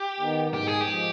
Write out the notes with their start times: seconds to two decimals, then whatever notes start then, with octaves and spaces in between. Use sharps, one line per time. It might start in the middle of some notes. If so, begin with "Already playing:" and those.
Already playing: G4
0.20 D#3 B3 D#4
0.54 G#2 G4
0.67 G#4
0.81 G4
0.88 F3 G#3